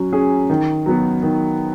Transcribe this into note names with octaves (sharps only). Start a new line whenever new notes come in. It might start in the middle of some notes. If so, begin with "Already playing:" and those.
Already playing: F#3 C#4
C#4 G#4
D#3
F#3 B3 F#4
D#3